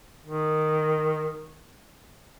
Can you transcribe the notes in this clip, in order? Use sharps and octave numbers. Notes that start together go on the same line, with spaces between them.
D#3